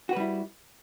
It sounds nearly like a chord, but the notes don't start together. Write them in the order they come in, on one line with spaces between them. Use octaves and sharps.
F#4 B4 G3 E4